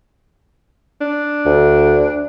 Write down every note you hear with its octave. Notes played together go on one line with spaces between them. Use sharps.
D4
D2